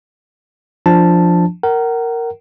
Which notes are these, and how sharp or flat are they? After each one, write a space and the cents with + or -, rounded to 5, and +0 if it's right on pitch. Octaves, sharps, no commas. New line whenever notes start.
F3 +0 D4 +0 A5 +0
A#4 -5 F#5 +35